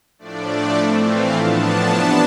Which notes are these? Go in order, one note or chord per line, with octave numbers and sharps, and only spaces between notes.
A2 F3 A3 D4 D5
E3 A3 C4
F5
A2 F3 B3 D4 A5
A5
C3 E3 B3 D4 A5